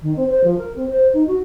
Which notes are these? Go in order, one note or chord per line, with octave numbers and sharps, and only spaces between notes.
D#3
C4
C5
F3
A#4
C4
C5
D#4
F#4